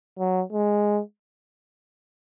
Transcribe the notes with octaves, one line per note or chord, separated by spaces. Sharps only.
F#3
G#3